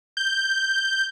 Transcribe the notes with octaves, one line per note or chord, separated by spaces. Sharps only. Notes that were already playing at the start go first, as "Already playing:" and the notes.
G6